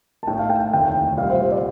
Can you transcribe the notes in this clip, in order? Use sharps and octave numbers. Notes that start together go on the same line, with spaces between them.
A5
A2 A3 D#4 G5
F5
G5
F1 D#2 D#3 A3 G5
C2 A#2 G3 F5
C5
C5
D5